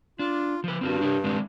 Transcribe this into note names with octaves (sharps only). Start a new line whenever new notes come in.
D4 F4
F3 B4
G2 C4 F4 F#4
D4 G4 C#5
G#3 C4 D4